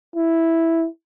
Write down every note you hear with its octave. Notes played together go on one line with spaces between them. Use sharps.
E4